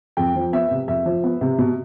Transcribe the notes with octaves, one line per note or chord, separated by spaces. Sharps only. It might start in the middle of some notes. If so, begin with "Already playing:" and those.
F2 G5
F3
B3 E5
C3
F2 E5
F3
B3
C3
B2